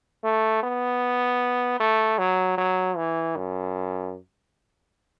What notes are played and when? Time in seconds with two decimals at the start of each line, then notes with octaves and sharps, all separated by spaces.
0.24 A3
0.63 B3
1.80 A3
2.19 F#3
2.58 F#3
2.97 E3
3.36 F#2